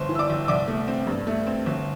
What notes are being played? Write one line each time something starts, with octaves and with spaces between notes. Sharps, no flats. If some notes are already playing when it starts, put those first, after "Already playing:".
Already playing: G1 C5 C6
E3
E6
D5 D6
G1
E6
C2 D5 D6
A3
C4
G2
A3
C4
G1